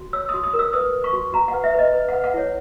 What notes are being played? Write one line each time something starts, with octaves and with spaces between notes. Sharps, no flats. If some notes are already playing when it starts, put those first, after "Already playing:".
Already playing: F#4
C#5 E6
D#6
F#4
D#6
A#4
E6
B4 D#6
B4
C#6
F#4
F#4 A#5
F#5
B4
E5
B4 D#5
B4
F#5
B4
F#5
E4 C#5